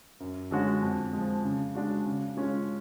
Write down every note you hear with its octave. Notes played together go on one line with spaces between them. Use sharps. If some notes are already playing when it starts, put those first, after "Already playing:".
F#2
D3 G#3 C#4 F#4
F2
F3 G#3
C#3
G#3 D4 F#4
C#3
G#3 C#4 F4